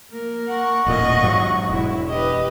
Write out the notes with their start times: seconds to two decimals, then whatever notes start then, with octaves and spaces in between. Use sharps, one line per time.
0.12 A#3 A#4
0.48 F#5 C#6
0.86 D#1 A1 A#2 D#5
1.23 G#2 F#3
1.69 E1 E4
2.09 G4 B4 D#5